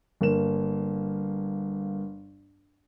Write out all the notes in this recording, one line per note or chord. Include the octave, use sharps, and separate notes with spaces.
G1 A#3 E7